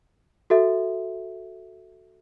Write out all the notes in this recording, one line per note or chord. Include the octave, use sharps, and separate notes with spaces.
F#4 A4 E5